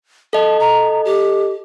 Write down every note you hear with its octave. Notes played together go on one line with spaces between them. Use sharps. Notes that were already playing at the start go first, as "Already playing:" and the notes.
A4 D#5 A5
A#5
G4